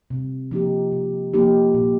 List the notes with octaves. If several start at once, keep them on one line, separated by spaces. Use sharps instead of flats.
C3
F3 A#3 D#4 G4
C3
F3 A#3 D#4 G4
A#2